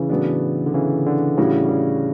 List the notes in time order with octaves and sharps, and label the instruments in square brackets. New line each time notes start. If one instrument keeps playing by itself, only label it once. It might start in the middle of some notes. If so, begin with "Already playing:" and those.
Already playing: [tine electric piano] C#3 E3
[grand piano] A2 F#3 B3 D4
[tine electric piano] D3
C#3 E3
D3
[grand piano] A2 E3 G3 D4 F#4 [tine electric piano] C#3
[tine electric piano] C#3